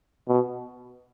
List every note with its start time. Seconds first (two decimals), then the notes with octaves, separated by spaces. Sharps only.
0.28 B2